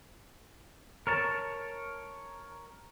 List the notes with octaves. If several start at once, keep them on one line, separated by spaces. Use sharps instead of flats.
A#4 C#5 A5